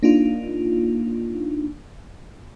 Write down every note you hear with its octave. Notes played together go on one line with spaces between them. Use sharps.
A#3 D4 D#4 F4